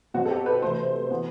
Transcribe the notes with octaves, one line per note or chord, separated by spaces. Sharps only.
B2 F#3 C4 F#4
A4
G4
B4
C3 E3 A3 C5
E3 B3